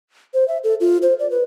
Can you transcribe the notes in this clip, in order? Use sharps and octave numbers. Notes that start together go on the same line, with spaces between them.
C5
E5
A4
F4
C5
D5
B4